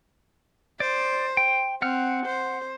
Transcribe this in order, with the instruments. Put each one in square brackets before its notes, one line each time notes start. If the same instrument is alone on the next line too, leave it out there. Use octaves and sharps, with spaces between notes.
[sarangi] C5 [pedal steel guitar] D5
[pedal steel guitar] G5
[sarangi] C4 [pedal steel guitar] F#5 F6
[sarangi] C5